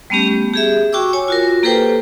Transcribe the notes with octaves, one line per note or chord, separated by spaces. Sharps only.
G3 A3 B3 C#4 G4
G4 G#4 E5
F#4 G5 C#6 D6 E6
C#5 G#5
F4 F#4 A#4
A#3 G4 A4 B4 C5 G5